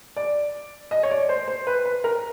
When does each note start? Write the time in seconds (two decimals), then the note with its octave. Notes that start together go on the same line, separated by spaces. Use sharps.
0.16 D5
0.91 D#5
1.03 C#5
1.11 D5
1.29 C5
1.48 C5
1.67 B4
1.85 B4
2.04 A#4